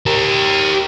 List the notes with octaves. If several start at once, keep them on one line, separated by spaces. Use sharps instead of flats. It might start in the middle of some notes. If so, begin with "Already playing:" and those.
G4 A#4